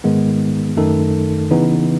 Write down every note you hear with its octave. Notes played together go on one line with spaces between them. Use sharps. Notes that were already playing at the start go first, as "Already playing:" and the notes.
G#2 D#3 G#3 B3
F#2 D#3 A3 D#4 A4
C#3 E3 B3 D#4